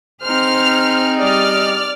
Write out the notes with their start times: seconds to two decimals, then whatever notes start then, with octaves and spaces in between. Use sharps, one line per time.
0.24 C4 D#4 G#4 C5 F6
1.18 G3 D5 D#5 F6